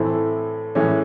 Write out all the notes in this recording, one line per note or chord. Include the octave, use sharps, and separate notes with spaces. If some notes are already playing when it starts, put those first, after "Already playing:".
Already playing: A2 E3 A3 C4 E4
A2 E3 G#3 C#4